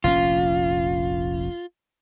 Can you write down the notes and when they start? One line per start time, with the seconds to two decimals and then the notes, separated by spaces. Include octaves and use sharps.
0.04 F1 A#1 C#4 F4